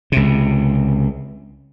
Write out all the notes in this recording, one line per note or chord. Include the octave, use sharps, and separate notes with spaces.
C#2 C3